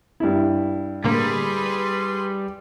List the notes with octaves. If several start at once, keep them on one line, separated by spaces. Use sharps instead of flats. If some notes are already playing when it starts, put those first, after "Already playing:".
G2 E4
A2 D3 G3 A#3 G#4 B4 C6